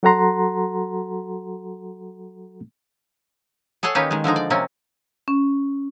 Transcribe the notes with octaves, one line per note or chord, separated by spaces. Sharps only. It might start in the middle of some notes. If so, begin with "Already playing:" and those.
F#3 F#4 A4 F#5 A#5 C6
G#4 A4 C#5 F#5 G#5
D#3 A#3 C#4 D#4 G4 B4
D#3 G#3
D3 F3 G#3 D#4
D5
C3 A#3 C4 C#4
C#4